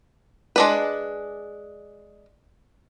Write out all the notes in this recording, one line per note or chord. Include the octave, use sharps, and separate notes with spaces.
G#3 D4 B4